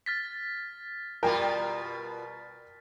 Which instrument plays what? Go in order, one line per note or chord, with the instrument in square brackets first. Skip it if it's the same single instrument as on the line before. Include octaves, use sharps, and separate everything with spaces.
[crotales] F6 A6 B6
[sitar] B2 G3 F4 [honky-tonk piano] A#4 G5 A#5